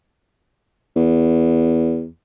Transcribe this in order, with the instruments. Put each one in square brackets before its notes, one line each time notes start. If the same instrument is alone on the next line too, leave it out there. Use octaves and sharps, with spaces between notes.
[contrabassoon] E2